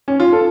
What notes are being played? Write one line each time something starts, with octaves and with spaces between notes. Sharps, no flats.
C#4
F4
A4